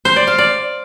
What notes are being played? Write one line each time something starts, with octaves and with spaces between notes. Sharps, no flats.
C5
D5
F5
D5